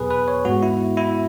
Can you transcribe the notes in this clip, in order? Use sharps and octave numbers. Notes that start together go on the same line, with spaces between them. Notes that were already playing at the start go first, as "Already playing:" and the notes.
Already playing: E2 B2 F#3 B3 G#4 B4
B4
C#5
G#2 G#3 B3 F#4
E4
E4